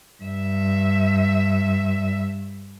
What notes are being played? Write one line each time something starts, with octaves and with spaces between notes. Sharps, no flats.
G2 E5